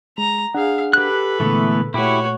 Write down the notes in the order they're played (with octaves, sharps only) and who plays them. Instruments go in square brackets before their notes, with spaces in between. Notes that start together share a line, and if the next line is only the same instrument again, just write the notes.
[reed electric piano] G#3 [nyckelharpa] A#5
[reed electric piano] D4 F#5 [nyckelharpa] G#4 F5
[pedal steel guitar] G4 F#6 [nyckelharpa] A4 B4
[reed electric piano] A#2 D3 G#3 [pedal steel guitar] E3 A3 B3
[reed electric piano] A#2 A3 [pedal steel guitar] E4 G4 [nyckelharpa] F#4 C#5